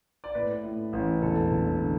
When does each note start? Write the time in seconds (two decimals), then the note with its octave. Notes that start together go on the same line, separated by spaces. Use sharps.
0.24 D5
0.34 A2 B4
0.63 A2
0.93 A1
1.22 E1 A4
1.51 E1
1.80 D3